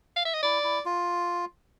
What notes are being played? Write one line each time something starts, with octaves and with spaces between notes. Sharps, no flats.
F5
E5
D#5
E4 D5
E4
F4